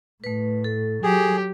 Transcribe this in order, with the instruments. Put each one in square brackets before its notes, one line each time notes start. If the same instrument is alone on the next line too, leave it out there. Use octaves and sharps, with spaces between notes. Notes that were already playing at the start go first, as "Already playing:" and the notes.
[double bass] A2 [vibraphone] A3 B4
[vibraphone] A4
[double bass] F#3 [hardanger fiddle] G4 [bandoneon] G#4